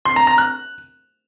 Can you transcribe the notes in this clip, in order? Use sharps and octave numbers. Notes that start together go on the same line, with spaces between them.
C6
A#5
A#5
F#6